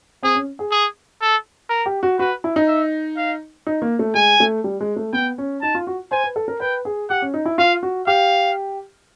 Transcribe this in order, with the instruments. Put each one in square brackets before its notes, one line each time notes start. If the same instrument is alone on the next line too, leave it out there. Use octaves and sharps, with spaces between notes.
[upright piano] C4 [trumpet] G#4
[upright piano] C#4
G#4
[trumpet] G#4
A4
A#4
[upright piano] G4
F#4
[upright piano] F#4 [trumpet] B4
[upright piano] E4
D#4
[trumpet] E5
F5
[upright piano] D#4
A#3
A3
[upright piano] G#3 [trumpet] G#5
[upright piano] A3
G3
G#3
A3
[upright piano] B3 [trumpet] G5
[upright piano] C#4
[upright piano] D#4 [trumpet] A5
[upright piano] F4
F#4
[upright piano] C5 [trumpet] G#5
[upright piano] B4
A4
A#4
[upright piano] B4 [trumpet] G5
[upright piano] G#4
[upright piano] G4 [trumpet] F#5
[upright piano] C#4
D#4
E4
[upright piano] F4 [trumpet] F5
[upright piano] F#4
[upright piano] G4 [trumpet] F5